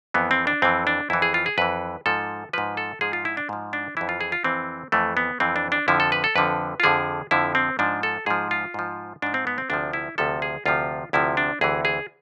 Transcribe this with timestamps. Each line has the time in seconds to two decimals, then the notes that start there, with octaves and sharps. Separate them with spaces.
0.14 F2 E3 B3
0.31 C4
0.47 D4
0.62 F2 E3 C4
0.87 D4
1.10 F2 E3 E4
1.22 G#4
1.34 F4
1.46 G#4
1.58 F2 E3 B4
2.06 G#2 F3 A4
2.53 G#2 F3 B4
2.77 A4
3.01 G#2 F3 G#4
3.13 F4
3.25 E4
3.37 D4
3.49 G#2 F3
3.73 D4
3.97 F2 E3 E4
4.09 F4
4.21 G#4
4.32 F4
4.44 F2 E3 C4
4.92 F2 E3 A3
5.17 B3
5.40 F2 E3 C4
5.56 D4
5.72 D4
5.88 F2 D3 F3 E4
6.00 A4
6.12 B4
6.24 A4
6.36 F2 D3 F3 B4
6.80 F4
6.83 F2 D3 F3 G#4
7.31 F2 D3 F3 E4
7.55 C4
7.79 G#2 F3 D4
8.03 A4
8.26 G#2 F3 G#4
8.51 F4
8.74 G#2 F3
9.22 G#2 F3 D4
9.34 C4
9.47 B3
9.58 C4
9.70 D2 C3 F3 D4
9.93 E4
10.18 D2 C3 F3 A4
10.42 G#4
10.66 D2 C3 F3 F4
11.13 D2 C3 F3 E4
11.37 D4
11.61 D2 C3 E3 G#4
11.85 G#4